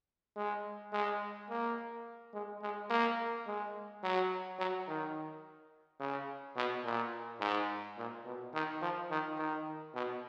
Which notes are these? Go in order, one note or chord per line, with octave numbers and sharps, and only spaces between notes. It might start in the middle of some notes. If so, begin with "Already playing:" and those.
G#3
G#3
A#3
G#3
G#3
A#3
G#3
F#3
F#3
D#3
C#3
B2
A#2
G#2
A#2
B2
D#3
F3
D#3
D#3
B2